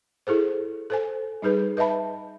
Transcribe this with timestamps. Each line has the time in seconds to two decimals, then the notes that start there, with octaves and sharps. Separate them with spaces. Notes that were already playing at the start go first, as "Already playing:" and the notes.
0.27 E4 G#4 A4 C5
0.90 A4 C5 G#5
1.42 G3 D#4 G#4 B4
1.77 B4 D#5 E5 A5 B5